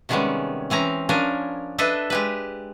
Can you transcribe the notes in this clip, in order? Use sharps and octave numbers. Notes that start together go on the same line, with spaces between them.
C3 D#3 G3 G#3 B3 C#4
E3 C4 C#4 A#5
F3 C#4 D4 A#4 G#5
D4 A4 B4 D#5 E5
G#3 G4 B4